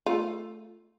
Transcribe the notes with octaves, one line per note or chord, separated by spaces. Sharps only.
A3 F4